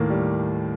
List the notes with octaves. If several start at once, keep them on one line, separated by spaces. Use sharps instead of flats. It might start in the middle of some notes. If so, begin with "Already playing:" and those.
Already playing: D#2 A2 A#3
G3